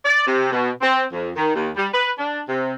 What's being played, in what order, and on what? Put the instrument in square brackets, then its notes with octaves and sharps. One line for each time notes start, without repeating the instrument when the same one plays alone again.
[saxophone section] D5
C3
B2
C4
F2
D#3
D#2
G3
B4
D4
C3